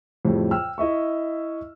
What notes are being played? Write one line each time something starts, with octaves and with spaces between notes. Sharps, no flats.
F2 A2 C#3 G3
G5 E6 F6
E4 D#5 E5 C#6